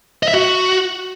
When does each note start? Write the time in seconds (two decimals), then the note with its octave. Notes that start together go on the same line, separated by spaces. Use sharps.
0.23 D#5
0.28 E5
0.34 F#4